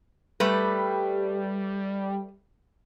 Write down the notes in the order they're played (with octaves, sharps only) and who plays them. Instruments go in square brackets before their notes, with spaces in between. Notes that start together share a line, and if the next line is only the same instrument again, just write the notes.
[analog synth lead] G3 [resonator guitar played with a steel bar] A3 B4